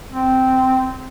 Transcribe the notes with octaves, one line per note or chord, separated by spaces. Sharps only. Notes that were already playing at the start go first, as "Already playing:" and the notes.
C4